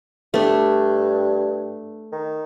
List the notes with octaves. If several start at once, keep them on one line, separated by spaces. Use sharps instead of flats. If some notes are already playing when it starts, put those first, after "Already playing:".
G2 A3 D4
D#3